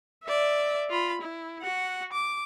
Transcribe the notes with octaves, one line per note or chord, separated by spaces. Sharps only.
D5 E5
F4 B5
E4
F#4 F#5
D6